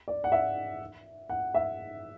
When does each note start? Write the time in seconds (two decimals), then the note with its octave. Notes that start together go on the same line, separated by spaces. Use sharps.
0.08 D5
0.24 F#5
0.32 E5
1.29 F#5
1.54 E5